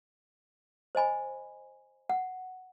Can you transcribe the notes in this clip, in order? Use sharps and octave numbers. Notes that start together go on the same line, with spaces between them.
C5 D#5 G#5 B5
F#5